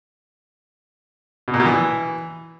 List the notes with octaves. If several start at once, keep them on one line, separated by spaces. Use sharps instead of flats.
B2
A#2
B2
E3